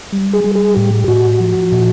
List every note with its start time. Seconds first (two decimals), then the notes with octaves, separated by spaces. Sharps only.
0.12 G3
0.33 G#4
0.44 G3
0.55 G#4
0.76 A2 G4
1.08 A2 F#4
1.40 F3
1.72 A#2